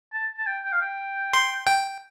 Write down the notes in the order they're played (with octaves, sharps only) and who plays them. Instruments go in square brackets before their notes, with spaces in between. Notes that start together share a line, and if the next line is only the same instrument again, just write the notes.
[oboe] A5
A5
G5
G5
F5
G5
[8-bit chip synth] C6
G5